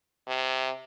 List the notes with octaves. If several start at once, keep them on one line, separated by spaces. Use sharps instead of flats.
C3